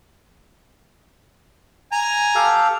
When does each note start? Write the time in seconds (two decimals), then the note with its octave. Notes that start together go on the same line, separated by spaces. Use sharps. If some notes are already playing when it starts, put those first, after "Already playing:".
1.92 G#5 A#5
2.35 G4 A4 F5